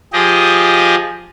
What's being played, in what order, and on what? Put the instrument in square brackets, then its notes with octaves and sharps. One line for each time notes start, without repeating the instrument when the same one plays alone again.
[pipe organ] F3 G4 G#4 D#5